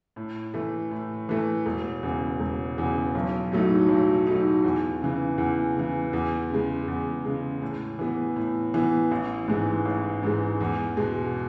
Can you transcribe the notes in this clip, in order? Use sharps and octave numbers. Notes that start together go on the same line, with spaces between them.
A2
E3 A3
A2
E3 A3
E1
E2 C#3
E1
E2 C#3
B1
A2 F#3 A3 D#4
B1
A2 F#3 A3 D#4
E2
C#3 E3
E2
C#3 E3
E2
C#3 G#3
E2
C#3 G#3
A2
E3 B3
A2
E3 B3
A1
G#2 E3 G#3
A1
G#2 E3 G#3
E2
B2 G#3